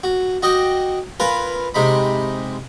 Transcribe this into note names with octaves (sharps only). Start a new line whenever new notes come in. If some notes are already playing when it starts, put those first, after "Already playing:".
F#4
F#4 D#5 G5 D6
F4 A#4 B4 G#5
C3 G#3 D#4 B5